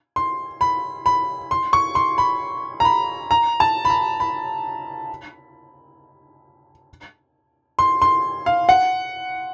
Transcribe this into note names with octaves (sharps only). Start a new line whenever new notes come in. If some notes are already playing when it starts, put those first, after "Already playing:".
C6
B5
B5
C6
C#6
C6
B5
A#5
B5
A#5
A5
B5
A#5
B5
C6
C6
F5
F#5